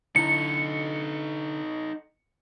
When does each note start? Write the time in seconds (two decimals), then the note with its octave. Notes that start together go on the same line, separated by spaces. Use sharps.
0.16 D3 D#4 E4 A4 A#5 C#7